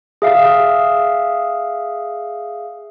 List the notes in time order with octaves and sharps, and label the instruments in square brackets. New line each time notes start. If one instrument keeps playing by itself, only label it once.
[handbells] G#4 E5 F5